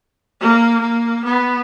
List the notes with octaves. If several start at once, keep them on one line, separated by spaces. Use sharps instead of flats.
A#3
A#3
B3